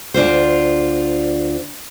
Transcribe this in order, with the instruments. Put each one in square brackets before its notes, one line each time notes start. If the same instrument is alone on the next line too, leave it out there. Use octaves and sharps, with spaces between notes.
[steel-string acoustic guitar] D2 D4 F4 C5